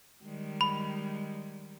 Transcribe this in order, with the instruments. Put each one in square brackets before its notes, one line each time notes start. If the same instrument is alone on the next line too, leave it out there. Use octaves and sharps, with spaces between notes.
[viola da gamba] D#3 G3 G#3
[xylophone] B5